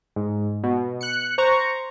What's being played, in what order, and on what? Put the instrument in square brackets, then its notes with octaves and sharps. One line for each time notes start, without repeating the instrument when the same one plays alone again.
[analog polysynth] G#2
B2
F#6 C#7
C5 A#5 C#6